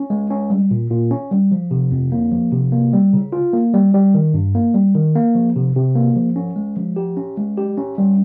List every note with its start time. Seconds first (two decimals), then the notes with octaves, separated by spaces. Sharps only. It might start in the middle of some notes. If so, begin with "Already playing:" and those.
Already playing: C#4
0.10 G#3
0.30 C#4
0.50 G3
0.71 A#2
0.90 A#2
1.11 C#4
1.31 G3
1.51 F3
1.71 C3
1.92 F2
2.12 A#3
2.32 F3
2.52 C3
2.72 A#3
2.93 G3
3.13 C#3
3.33 F4
3.53 A#3
3.74 G3
3.94 G3
4.14 D#3
4.34 G2
4.55 A#3
4.74 G3
4.95 D#3
5.16 A#3
5.35 F3
5.56 C3
5.76 C3
5.95 A#3
6.16 F3
6.36 C#4
6.56 G#3
6.77 F3
6.96 G4
7.17 C#4
7.37 G#3
7.57 G4
7.78 C#4
7.98 G3